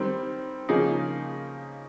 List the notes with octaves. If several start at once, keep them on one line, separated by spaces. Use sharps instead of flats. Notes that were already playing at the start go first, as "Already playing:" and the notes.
Already playing: D#3 G3 C4
C#3 F3 A#3 D#4 G#4